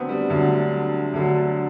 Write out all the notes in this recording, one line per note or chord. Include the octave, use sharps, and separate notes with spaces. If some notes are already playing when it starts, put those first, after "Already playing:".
Already playing: D2 D3 F#3 B3 C4
G3
D2 D3 F#3
D2 D3 F#3